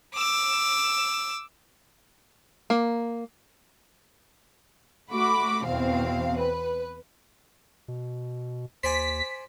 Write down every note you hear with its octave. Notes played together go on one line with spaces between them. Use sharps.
D6 E6
A#3
A3 F#4 B5 D6
E2 B2 C4 F5
B4
B2
D#2 C5 D5 G#5 B6